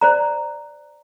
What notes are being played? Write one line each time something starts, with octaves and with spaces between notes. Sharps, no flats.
C5 D5 A#5